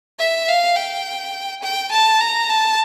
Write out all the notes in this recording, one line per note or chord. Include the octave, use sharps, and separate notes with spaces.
E5
F5
G5
G5
A5
A#5
A5